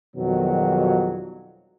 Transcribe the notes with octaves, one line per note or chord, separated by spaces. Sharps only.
F2 B2 D#3 F#3 G3